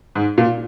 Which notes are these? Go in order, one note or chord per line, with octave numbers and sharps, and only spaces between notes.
G#2
A#2